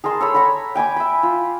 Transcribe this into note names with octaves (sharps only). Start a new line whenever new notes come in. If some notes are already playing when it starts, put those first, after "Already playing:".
G#4 A#4 A5 C6
A4 C#5 B5
C#5 F#5 A#5 B5
G5 G#5 B5 D6
E5 B5
F4